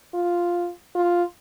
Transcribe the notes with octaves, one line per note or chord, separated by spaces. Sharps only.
F4
F4